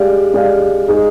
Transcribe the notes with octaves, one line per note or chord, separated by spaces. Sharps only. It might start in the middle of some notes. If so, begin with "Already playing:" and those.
Already playing: G#3 D4 G4 D5 F5
G#3 D4 G4 D5 F5
G#3 D#4 G#4 D#5